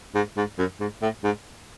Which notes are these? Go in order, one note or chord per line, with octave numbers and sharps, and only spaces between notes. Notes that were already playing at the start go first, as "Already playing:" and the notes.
G#2
G#2
F#2
G#2
A2
G#2